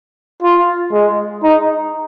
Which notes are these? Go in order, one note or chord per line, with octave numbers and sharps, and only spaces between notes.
F4
G#3
D#4